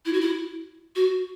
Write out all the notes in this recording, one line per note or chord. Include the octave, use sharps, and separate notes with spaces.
E4
F#4
E4
F#4